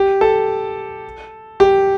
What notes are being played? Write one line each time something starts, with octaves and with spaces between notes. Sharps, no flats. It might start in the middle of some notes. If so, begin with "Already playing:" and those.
Already playing: G4
A4
G4